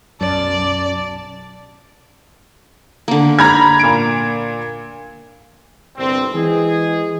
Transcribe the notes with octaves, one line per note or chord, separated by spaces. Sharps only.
B1 F#2 D5 A5
D3 A#3
A#5 B5 G#6
A#2 D7
G1 C2 C4
E3 G#3 G#4